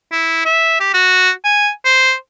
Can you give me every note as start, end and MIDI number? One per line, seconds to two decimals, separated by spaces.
0.12 0.44 64
0.46 0.77 76
0.80 0.92 67
0.94 1.30 66
1.44 1.70 80
1.85 2.13 72